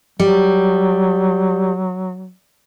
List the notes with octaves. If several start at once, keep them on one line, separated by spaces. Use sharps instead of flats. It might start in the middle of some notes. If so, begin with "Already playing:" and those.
F#3 G3